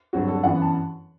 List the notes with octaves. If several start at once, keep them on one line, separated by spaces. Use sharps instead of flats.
G2 D3 F#3 C4 F#4
A4
F#2 E3 B3 F#5
A5